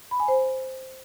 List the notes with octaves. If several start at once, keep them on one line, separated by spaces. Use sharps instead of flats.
B5
G#5
C5